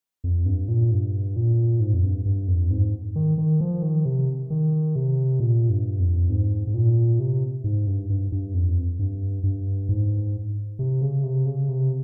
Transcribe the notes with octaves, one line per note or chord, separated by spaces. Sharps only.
F2
G2
A#2
G2
A#2
G#2
F2
G2
G2
F2
G#2
D#3
D#3
F3
D#3
C3
D#3
C3
A#2
G2
F2
G#2
G#2
A#2
C3
G#2
G2
G2
G2
F2
G2
G2
G#2
C3
C#3
C3
C#3
C3